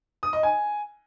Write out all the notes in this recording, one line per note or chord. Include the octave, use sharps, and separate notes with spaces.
D#6
D#5
G#5